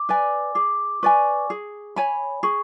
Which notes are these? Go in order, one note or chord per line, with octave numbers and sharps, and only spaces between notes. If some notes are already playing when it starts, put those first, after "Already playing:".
Already playing: D6
B4 D5 G#5
G#4 D6
B4 D5 G#5 C#6
G#4
C#5 G#5 B5
G#4 C#6